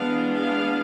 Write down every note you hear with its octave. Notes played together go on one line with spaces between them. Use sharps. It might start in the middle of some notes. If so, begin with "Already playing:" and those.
Already playing: E3 G#3 B3 D4 F5
F5